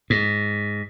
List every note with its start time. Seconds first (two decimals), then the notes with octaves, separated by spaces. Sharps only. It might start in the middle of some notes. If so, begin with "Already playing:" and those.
0.10 G#2